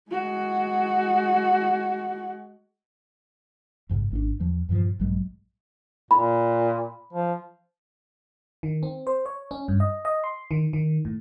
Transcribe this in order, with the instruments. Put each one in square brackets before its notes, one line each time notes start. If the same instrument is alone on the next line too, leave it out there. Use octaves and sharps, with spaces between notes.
[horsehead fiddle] G#3 F#4
[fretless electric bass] A1 G#2 C#3
G#1 C4 D4
E2 F3
G2 A#2 E3 F3
A#1 G2 F#3 G#3
[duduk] A#2 [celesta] B5
[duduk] F3
[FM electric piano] D#3
C4
C5
C#5
C#4
G2
D#5
D#5
C6
D#3
D#3
A2